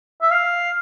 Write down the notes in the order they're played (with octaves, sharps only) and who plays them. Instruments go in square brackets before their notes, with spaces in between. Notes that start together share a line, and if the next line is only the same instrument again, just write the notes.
[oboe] E5
F5